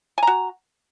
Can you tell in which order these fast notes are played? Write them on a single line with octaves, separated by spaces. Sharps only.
G#5 A#5 F#4